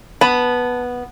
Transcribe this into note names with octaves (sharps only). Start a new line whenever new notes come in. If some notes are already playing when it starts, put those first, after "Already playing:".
B3 A5 B5